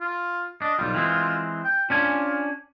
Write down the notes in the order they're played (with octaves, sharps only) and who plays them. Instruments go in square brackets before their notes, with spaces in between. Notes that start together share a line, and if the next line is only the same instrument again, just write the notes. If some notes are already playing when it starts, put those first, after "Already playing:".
[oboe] F4
[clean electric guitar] D4 [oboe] D#5
[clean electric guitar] B1 G3 [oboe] F4
[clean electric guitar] E3 G#3 C4
[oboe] G5
[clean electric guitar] C#4 D4 G#5 [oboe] F4